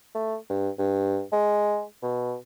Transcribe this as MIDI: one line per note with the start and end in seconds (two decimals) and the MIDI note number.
0.15 0.36 57
0.50 0.69 43
0.78 1.22 43
1.32 1.83 56
2.03 2.36 47